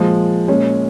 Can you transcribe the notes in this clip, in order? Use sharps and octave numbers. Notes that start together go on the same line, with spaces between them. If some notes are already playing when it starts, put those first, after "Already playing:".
Already playing: A#2 F3 G#3
A#2 G#3 C#4